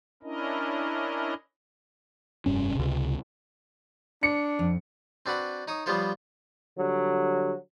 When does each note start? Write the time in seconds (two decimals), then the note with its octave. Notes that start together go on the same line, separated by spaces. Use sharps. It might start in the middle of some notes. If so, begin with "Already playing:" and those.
0.23 C#4 D4 E4 A#4 D#5
2.46 F1 G2 C#4
2.76 C#2 C3
4.23 D4 C#7
4.59 F2
5.26 C4 D4 F#4 B4 F#5
5.68 D#4 C#5 D#6
5.86 F3 G3 B3 F4 C5 C#5
6.77 D3 F#3 G3